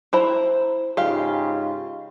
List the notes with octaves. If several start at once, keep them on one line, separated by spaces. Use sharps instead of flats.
E4 C5 A#5
G#2 C#3 F4 G4 F5